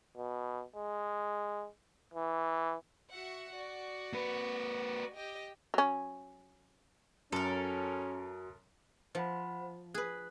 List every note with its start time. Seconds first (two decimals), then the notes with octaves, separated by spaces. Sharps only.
0.16 B2
0.76 G#3
2.14 E3
3.10 F#4 E5 F#5
3.55 F#4 D5
4.13 A#3 B4
5.15 G4 D#5 G5
5.74 F#3 C#4
7.32 F#2 C#4 F#4 A4 A#4
9.15 F3 C5 F#5 B5
9.94 G#4 B4 F#6